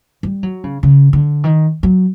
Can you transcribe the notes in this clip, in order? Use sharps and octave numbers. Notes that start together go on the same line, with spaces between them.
G3
F#3
C#3
C#3
D3
D#3
F#3